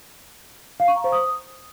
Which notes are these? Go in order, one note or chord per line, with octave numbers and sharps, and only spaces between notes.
F5
C#6
A#5
C5
D#6